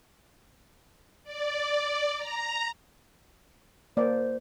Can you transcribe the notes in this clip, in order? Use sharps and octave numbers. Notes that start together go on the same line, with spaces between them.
D5
A#5
A#3 C5 D5